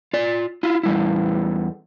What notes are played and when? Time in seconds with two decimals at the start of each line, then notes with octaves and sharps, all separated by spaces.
0.13 F4 D5
0.63 E4 F4
0.83 E2 G3 E4